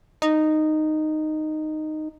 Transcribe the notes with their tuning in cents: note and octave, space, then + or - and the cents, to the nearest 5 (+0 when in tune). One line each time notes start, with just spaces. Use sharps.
D#4 -10